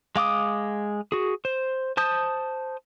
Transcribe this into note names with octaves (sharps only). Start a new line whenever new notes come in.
G#3 F5 D6 D#6
F#4 G#4
C5
C5 A5 D#6 G6